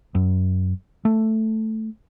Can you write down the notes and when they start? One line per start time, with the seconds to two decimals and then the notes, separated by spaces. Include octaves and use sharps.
0.15 F#2
1.05 A3